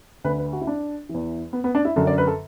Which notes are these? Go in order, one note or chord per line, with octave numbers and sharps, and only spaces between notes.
D2 D3 B4
B4
F#4
E4
D4
E2 E3
B3
B3
D4
E4
F#2 D3 A4
D5
B4
A4